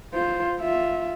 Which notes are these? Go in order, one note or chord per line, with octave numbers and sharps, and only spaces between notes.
F4 C5
F4 E5